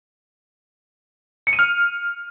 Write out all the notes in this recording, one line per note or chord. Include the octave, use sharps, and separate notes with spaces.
C#7
D#7
F6